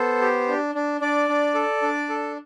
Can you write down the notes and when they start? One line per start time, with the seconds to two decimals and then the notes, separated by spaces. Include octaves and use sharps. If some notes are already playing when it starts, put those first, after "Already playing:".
Already playing: B3 A4 C5
0.21 G4
0.48 D4
0.75 D4
1.01 D4 D5
1.29 D4
1.55 A4
1.82 D4
2.09 A4